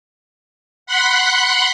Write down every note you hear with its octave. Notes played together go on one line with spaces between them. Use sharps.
F#5 B5 C6 F#6